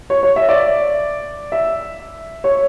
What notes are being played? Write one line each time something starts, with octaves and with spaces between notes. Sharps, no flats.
C#5
C#5
E5
D5
E5
C#5